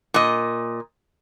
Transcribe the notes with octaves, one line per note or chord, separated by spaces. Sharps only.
A#2 D#5